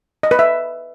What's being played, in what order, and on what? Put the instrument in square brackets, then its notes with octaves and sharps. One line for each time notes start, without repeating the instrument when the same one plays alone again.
[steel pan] D#5
B4
E5